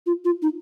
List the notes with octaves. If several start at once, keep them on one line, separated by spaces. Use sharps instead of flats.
F4
F4
D#4